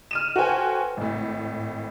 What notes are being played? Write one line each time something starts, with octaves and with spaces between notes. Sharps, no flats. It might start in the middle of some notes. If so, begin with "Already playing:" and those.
F6 D#7 E7
F#4 A4 B4 C5 G5 G#5
G#1 A2